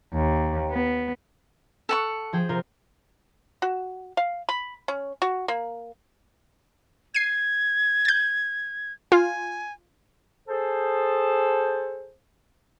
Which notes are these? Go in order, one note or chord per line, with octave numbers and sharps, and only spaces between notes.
D#2
B3
A4 F#5 C#6
F3 G#4 G5
C3 F4 A#4
F#4
F5
B5
C#4
F#4
A#3
G#6 C7 D#7
G6 A6
F4 G#5
G#4 A4 C5